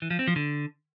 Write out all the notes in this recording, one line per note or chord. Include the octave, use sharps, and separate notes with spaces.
E3
F3
C4
F3
D3